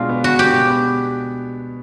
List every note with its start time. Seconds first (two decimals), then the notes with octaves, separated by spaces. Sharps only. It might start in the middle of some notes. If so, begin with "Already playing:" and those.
Already playing: B2 G#3 D4 F4
0.09 B3
0.24 B2 F#4
0.39 B3 G4
0.55 B2
0.70 B3